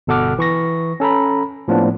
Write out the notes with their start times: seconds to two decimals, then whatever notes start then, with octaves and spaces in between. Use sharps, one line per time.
0.07 G1 B2 A4 F#5 D6 F6
0.38 E3 C#6 A#6
1.00 C#4 A4 A#5 B5
1.68 A2 F3 A#3 B3 D4